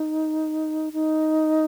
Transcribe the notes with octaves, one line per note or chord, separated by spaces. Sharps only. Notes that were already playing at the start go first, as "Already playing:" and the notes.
Already playing: D#4
D#4